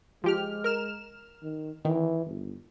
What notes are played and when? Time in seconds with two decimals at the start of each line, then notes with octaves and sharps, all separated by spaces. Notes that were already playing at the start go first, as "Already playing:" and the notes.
0.24 F3 G#3 G4 F6
0.64 A#4 F6 E7
1.43 D#3
1.85 D#3 E3
2.26 G1